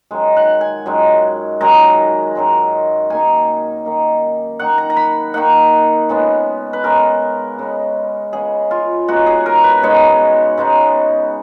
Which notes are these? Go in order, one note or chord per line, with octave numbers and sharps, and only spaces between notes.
F#2 D#3 G#3
F#5
G#5
F#2 D#3 G#3
F#2 D#3 G#3 A#5
F#2 D#3 G#3
D#3 A#3 D#4 G#5
D#3 A#3 D#4
D#3 A#3 D#4 F#5
A#5
A#5
B5
D#3 A#3 D#4 F#5
C#3 G#3 B3
B4
C#3 G#3 B3 A#4
C#3 G#3 B3
C#3 G#3 B3 G#4
F4
C#3 G#3 B3 D#4 F#4
G#4
A#4
B4
C#3 G#3 B3 D#4 C#5
C#3 G#3 B3 D#4